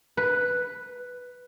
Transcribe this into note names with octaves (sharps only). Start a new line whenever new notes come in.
B4